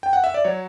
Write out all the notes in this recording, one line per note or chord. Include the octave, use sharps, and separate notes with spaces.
G5
F#5
E5
D5
F#3 C#5